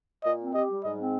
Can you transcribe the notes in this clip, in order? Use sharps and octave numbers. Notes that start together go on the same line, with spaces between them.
A#2 D#5
C4
G4 D#5
G3
G#2 D#5
C4